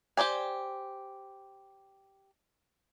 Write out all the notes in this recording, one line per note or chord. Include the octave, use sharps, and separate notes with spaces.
G4 C5 D5 G#5